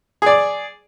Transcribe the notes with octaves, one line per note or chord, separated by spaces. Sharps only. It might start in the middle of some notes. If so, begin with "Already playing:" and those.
G#4 D5